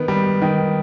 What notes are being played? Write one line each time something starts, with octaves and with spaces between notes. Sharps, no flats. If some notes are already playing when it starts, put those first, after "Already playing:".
Already playing: D#3 B3
G3
D#3